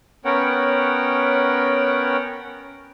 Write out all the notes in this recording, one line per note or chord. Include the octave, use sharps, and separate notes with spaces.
B3 C#4 A#4 C#5 F#5 G5